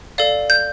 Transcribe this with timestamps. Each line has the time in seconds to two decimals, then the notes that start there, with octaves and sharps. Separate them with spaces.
0.18 A4 D5 F5
0.50 G6